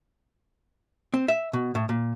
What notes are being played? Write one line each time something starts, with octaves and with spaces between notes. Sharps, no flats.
C4
E5
B2
A2
A#2